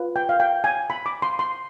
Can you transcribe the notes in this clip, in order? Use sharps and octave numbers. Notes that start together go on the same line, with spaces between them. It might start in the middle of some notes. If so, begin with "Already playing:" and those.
Already playing: F4 B4
G5
F5
G5
G#5
B5
D6
C6
C6